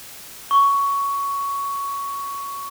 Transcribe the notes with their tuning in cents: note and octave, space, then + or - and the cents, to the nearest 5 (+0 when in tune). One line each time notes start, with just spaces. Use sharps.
C#6 +10